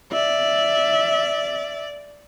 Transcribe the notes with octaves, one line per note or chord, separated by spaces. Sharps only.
D5 E5